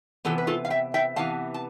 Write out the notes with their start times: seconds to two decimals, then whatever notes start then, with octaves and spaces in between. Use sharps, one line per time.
0.25 C3 E3 B3 F4 A4
0.38 B4
0.47 F4 A4
0.65 F5
0.70 E5 G5
0.94 E5 G5
1.16 C3 E3 B3 F5 A5
1.54 A5